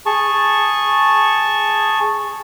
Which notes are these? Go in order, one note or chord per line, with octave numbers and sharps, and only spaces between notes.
G#4 A5 C#6